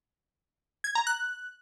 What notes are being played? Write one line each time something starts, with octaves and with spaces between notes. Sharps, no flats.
G#6
A#5
F#6